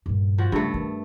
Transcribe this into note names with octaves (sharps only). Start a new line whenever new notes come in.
G2 A#2
F3 F#4
G2 C#3 A3 C#4
D#3